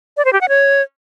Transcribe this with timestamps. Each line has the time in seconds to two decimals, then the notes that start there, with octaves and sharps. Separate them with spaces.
0.17 D5
0.25 C5
0.33 G4
0.41 F#5
0.49 C#5